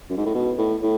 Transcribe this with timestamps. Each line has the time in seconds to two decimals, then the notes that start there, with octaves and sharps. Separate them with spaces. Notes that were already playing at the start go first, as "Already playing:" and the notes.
0.09 F#2
0.17 G#2
0.26 A2
0.34 B2
0.58 A2
0.82 A2